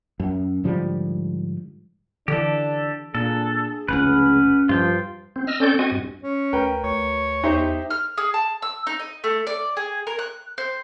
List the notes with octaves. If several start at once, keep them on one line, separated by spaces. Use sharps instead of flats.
F#2
G#2 D3 F3 G3
D3 E3 D4 G4 A4
A#2 D4 G#4 A4
F1 C#2 C#4 B4 F#5
G2 F3 F4 G5
C4
D#5 E6 F6
C4 C#4 A4 D5 G6
C4 F#4 D#5 G#5
G2
C#4
D2 A#4 B4 G5
D2 C#5
E2 D#4 G4 C5 E5
F6
G#4
A5
E6
D#4
D#5
A3
D5
G#4
A#4
F#6
C5